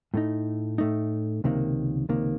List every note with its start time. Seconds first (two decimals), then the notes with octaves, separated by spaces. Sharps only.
0.14 A2 A3 D#4
0.78 A2 A3 D#4
1.44 C#2 C3 D#3 A#3
2.09 C#2 C3 D#3 A#3